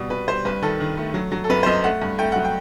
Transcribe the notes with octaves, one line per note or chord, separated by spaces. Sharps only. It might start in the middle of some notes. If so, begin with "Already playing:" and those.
Already playing: B2 G3
B2 B4
G3 C5
G2 B4
D#3 A4
D#3
A3
F#3
F#3
A4
F#2 B4
C5
F#2 D#5
A3 F#5
G2
A3 G5
F#3 F#5
G5